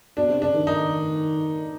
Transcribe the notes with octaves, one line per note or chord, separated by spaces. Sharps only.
B2 D4
C3
C#3 D4
D#3
D#3 D#4